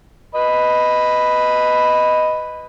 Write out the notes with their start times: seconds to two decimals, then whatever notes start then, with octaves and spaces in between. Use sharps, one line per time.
0.35 B4 D#5 B5